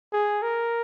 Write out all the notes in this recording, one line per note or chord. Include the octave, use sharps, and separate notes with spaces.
G#4
A#4